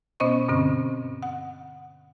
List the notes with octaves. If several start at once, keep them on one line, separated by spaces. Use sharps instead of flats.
B2 B3 C#4 C5 D#5 C#6
G2 B2 D3 C4 C#4
F#5